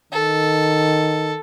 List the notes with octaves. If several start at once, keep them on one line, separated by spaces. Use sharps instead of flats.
D#3 A4